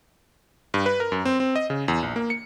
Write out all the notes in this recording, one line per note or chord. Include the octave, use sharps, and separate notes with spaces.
G2
B4
A#4
F#2
C4
C4
D#5
C#3
E2
A#1
A#3
C#7